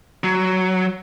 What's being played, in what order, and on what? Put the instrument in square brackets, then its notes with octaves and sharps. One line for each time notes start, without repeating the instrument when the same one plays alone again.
[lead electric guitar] F#3